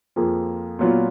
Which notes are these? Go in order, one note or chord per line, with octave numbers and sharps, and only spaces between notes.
F2 F3 A#3 F4 G#4
A#2 F#3 B3 F4